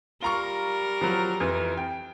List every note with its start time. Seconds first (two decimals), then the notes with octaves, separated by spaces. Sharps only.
0.22 G3 F4 A#4 A#5 C#6
1.01 F3 F#3
1.40 F2 E3
1.77 G5